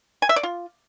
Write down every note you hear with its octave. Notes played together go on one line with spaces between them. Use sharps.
G#5
E5
D5
F4